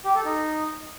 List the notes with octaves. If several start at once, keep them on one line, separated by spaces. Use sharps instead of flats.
G4
A4
D#4